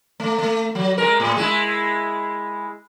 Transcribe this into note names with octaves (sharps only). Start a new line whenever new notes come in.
A3
A3
F#3
G#3 A#4
A2
G#3 E4